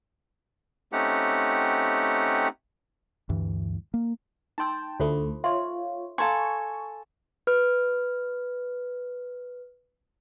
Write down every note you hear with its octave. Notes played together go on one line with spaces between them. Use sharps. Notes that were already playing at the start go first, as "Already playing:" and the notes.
A3 C4 C#4 D#4 G4 F#5
D2 G2 E3
A#3
D#4 G5 A5 C6 E6
D2 D3 A3 F4 A4 C5
F4 C#5 E5 C6
A4 F5 G#5 A#5 C6 C#6
B4 F6